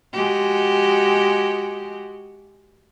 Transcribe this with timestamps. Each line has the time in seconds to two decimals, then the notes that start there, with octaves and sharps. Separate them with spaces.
0.13 G#3 F#4 G4